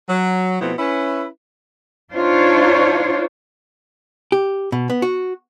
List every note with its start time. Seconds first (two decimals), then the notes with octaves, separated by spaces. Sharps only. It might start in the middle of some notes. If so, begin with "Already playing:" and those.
0.09 F#3
0.60 B2 F3 A3 B3 C4 E4
0.78 C#4 E4 B4
2.13 D4 D#4 F4 C5 C#5
4.32 G4
4.72 B2
4.90 B3
5.02 F#4